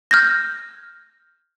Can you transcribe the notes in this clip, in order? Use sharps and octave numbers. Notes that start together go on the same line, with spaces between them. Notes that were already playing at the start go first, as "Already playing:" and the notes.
F6 G6 G#6 A#6